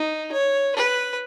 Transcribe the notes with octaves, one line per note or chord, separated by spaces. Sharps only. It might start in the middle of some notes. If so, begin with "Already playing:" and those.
Already playing: D#4
C#5
B4